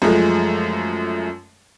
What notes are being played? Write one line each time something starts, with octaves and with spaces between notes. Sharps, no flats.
F#2 F3 G#3 A3